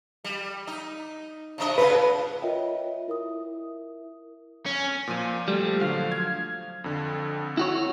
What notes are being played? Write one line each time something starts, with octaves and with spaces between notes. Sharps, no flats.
G3
D#4
C3 D4 D#5
C#3 C4 F4 B4
F4 A#4 C#5 D#5 E5 G5
E4 A#4 E5 D#6
C#4
A#2 F3 D#7
G3 A3
D3 F3 F#3 F5
G#6
F2 D3
E4 F#4 C#5